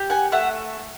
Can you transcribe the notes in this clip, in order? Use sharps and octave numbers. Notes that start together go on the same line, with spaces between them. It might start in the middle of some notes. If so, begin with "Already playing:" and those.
Already playing: G4
F#5 G#5
A3 E5 F#5